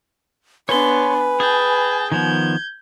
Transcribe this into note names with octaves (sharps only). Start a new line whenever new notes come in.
B3 D4 B4 C#5 G#5 C6
G#4 G5 A5
D#3 F3 B3 G6 G#6